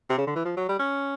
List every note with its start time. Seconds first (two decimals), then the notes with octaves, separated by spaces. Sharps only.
0.09 C3
0.18 C#3
0.27 D3
0.35 E3
0.45 F3
0.56 F#3
0.68 G3
0.79 C#4